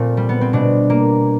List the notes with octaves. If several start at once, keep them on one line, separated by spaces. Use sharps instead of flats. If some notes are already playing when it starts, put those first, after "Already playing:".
Already playing: A#2 A3 C4 F4
G3
B3
C4
B2 D4
A#3